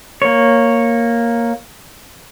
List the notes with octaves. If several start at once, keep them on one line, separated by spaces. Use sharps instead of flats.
A#3 C#5